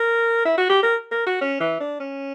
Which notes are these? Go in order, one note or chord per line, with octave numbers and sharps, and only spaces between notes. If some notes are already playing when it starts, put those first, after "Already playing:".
Already playing: A#4
E4
F#4
G4
A#4
A#4
F#4
C#4
E3
D4
C#4